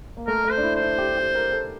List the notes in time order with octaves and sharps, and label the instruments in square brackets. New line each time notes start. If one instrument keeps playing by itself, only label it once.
[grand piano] A#3
[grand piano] A3 [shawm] A#4
[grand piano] A3
[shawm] C5
[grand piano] D4
E4
[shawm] C5
[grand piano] E4
G4
G4
A#4
A4